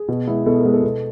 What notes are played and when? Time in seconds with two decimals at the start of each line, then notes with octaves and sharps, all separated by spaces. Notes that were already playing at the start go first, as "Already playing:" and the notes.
Already playing: G#4
0.08 B2
0.27 G#3 B3 E4
0.46 B2 A4
0.60 A#4
0.65 G#3 B3 E4
0.74 A4
0.83 B2